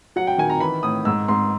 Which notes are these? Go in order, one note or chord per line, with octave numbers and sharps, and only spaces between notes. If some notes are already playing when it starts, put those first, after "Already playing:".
F#3 F#5
G5
D#3 G#5
A#5
E3 B5
A2 D#6
G#2 E6
G#2 C6